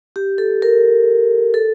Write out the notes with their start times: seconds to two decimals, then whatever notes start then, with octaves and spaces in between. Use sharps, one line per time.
0.16 G4
0.38 A4
0.62 A#4
1.54 A4